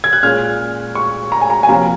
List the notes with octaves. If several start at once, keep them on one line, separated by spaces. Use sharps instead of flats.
G#6
F#6
A#2 G#3 C#4 F6
C#6
A#5
G#5
A#5
G#5
C3 F3 A#3 C#4 A#5